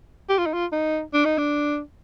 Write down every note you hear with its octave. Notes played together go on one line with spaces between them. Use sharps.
G4
F4
D#4
F4
D#4
D4
D#4
D4